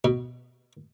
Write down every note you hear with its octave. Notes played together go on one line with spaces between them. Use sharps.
B2